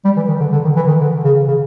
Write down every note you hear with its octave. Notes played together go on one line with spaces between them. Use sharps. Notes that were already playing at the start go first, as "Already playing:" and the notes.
G3
E3
D#3
D3
D3
D#3
E3
D#3
D3
C#3
C#3